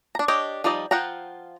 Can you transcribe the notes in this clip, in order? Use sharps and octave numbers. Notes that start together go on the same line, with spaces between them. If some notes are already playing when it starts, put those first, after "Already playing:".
D4 A#5
D4 G4 C#5 D#5
F3 G3 D#4 D5 D#5
F3 F4 F#5 G5 A#5